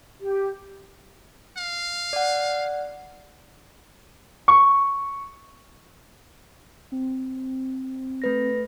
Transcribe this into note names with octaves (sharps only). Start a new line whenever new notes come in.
G4
F5
D5 F#5
C#6
C4
A3 B4 A#6